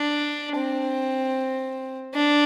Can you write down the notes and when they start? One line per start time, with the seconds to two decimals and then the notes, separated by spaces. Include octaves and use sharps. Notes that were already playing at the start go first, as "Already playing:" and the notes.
Already playing: D4
0.57 C4
2.14 D4